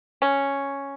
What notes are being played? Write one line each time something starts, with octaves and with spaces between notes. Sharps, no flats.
C#4